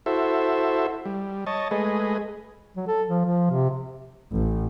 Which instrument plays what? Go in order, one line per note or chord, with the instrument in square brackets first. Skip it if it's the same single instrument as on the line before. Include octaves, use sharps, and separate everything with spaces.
[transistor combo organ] E4 F#4 A4 C5 E5
G3
C#5 D#5 A5
G#3 A3 G#4 B4 D#5
[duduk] F#3
A4
F3
F3
C3
[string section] A1